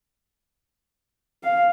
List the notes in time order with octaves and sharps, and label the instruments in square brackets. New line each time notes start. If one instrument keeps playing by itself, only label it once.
[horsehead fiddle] F5